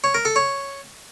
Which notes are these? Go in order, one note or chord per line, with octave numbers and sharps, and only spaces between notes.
C#5
A#4
A4
C#5